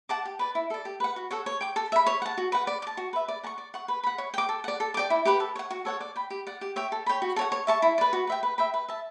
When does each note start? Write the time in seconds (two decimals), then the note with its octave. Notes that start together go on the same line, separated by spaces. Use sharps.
0.09 F#5 A5 D6
0.25 G4
0.39 B4 D5
0.55 E4
0.70 A4 D5
0.85 G4
1.00 B4 F#5
1.16 F#4
1.31 A4 C#5 F#5
1.46 C#5
1.61 G5 D6
1.76 A4
1.92 E5 B5
2.06 C#5
2.22 F#5 A5
2.37 F#4
2.52 B4 F#5
2.67 D5
2.82 D6
2.87 A5
2.97 F#4
3.13 B4 E5
3.28 D5
3.43 F#5 A5 C#6
3.58 D5
3.74 F#5 C#6
3.88 B4
4.03 F#5 B5
4.18 C#5
4.34 G5 D6
4.49 A4
4.64 D5 F#5
4.80 A4
4.94 D6
4.97 D5 G5
5.10 E4
5.25 G4 B4 F#5
5.40 A4
5.56 C#5 F#5
5.70 F#4
5.85 A4 C#5 F#5
6.01 D5
6.16 G5 B5
6.30 G4
6.47 D5 F#5
6.61 G4
6.76 C#5 E5 G5
6.92 A4
7.06 C#5 G5 B5
7.22 F#4
7.36 A4 C#5 F#5
7.52 C#5
7.67 E5 A5 C#6
7.82 E4
7.98 B4 D5
8.13 F#4
8.27 B4 E5 G5
8.43 B4
8.58 E5 G5 B5
8.74 B4
8.89 E5 A5